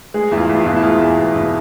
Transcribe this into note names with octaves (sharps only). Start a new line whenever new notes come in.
G#3 G#4
E2 E4
F4
E2
F4
E4
B2
E4
G#3 F4
E2
E2
B2